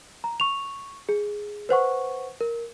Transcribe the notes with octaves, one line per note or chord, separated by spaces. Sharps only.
A#5
C#6 F7
G#4
B4 C5 F#5 C#6
A#4